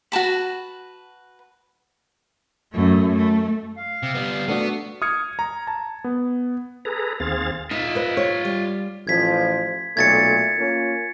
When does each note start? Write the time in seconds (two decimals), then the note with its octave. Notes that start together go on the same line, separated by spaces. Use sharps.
0.12 F#4 B4 A5 B5
2.73 F#2 A3
3.16 A3
3.77 F5
4.03 C3
4.14 G3 B3
4.48 A3 B3 D4 F#4
5.02 D#6 F6 G#6 C#7
5.39 A#5
5.67 A5
6.04 B3
6.85 G#4 A4 B4 A#5
7.20 D#2 C4 G#4 F5 A6
7.71 D#4 F4 E5
7.95 B4 D#5
8.17 C#5
8.45 G3
9.07 A1 F3 G#6 B6
9.97 B1 A#2 A3 G#6 A6 C#7
10.58 A#3 C#4 F4